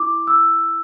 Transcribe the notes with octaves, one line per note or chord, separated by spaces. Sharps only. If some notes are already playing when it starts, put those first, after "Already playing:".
Already playing: E4 D6
E6